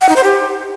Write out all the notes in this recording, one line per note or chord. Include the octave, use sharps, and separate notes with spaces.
F#5
D#4
C5
G4